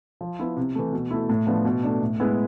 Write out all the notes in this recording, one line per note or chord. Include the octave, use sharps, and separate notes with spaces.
F3
B3 E4
C3
E3 A3
B2
A3 E4
A2
F3 B3 D4
B2
A3 D4
A2
G#3 B3 E4